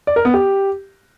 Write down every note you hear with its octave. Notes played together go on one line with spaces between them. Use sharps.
D5
A#4
B3
G4